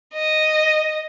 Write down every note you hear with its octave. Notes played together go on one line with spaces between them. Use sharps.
D#5